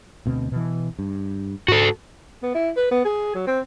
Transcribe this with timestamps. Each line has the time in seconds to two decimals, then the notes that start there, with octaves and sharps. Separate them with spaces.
0.26 D2 B2 C4
0.52 B2 E3
0.99 G2
1.68 G#2 F#4 A4
2.43 B3
2.55 E4
2.76 B4
2.91 B3
3.05 G#4
3.34 F#3
3.47 C4